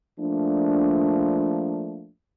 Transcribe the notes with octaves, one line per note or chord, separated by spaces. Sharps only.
F3 A3 A#3 D4